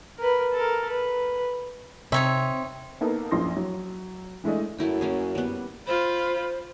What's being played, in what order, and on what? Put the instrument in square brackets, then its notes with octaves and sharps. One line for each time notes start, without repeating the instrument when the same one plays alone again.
[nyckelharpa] A#4 B4
A4 A#4
B4
[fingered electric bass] C3 [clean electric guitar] C4 [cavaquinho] D#4 C#5 E5
[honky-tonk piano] A#3 B3 D#4 A4 A#4
A#1 F#2 F3 C6 A#6
F#3
E3 G#3 A3 D4 D#5
[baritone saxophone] F#2 [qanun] A3 E4 G5
[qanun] A#3 C#4 G#4
G3 B3
[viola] F4 B5 [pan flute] C5